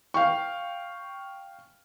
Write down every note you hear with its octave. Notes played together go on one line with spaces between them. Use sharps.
F5 G5 C#6